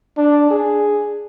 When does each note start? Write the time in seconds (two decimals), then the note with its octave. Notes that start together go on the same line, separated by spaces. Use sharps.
0.17 D4
0.51 G#4